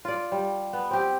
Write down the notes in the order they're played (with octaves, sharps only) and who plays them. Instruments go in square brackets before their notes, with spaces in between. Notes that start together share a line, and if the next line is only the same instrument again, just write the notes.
[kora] F4 D5
G3
B3
C4 G4